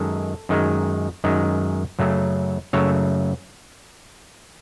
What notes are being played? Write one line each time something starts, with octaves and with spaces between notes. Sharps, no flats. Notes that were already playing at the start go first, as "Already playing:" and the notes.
Already playing: F#2 D#3 G#3 A4
F#2 D#3 G#3
F#2 D#3 G#3
F#2 C#3 F#3 A3
F#2 C#3 F#3 A3 C#5 E5